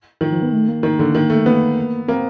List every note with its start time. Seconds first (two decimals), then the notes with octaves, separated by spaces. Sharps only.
0.21 D#3 F3
0.32 F3
0.42 B3
0.52 A3
0.68 A#3
0.83 D#3
0.99 D3
1.15 D#3
1.30 A3
1.46 A#3 B3
2.08 A#3 C4